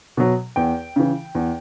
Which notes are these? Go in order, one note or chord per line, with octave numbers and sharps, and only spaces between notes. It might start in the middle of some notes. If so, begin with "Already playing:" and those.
B2 F#3
E2 G5
C#3 E3
E2